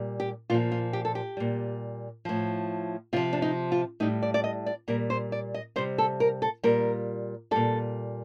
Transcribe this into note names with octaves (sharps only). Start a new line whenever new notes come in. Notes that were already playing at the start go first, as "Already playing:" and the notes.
Already playing: A#2 G3
G4
A#2 F3 F4
F4
G4
A4
G4
A#2 G3
A2 F3
C3 F3 F4
D4
D#4
F4
A2 G3 D#4
D5
D5
D#5
D5
A#2 G3 A#4
C5
D5
D#5
C3 G3 C5
A4
A#4
A4
A#2 G3 A#4
A#2 G3 A4